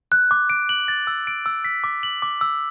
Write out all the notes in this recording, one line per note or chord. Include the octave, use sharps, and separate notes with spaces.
F#6
D6
D7
F#7
A6
E6
D7
E6
B6
D6
F#7
D6
E6